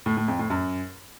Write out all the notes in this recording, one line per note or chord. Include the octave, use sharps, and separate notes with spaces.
A2
A2
F2
A2
F#2